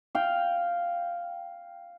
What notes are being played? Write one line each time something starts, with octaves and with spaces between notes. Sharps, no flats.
F5 G5